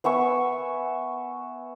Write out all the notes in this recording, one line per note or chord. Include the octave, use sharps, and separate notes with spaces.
B3 E5 G#5 C#6